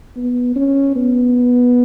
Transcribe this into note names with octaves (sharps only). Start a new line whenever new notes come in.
B3
C#4
B3